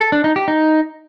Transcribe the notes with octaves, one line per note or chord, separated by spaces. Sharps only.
A4
D4
D#4
G4
D#4